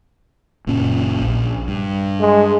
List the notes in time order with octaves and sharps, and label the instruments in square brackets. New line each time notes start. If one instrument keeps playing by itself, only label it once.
[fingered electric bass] F#1 A#2 C#4
A#1
G2
[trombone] G#3